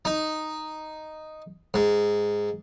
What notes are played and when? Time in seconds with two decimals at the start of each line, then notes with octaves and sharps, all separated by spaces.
0.05 D#4
1.74 G#2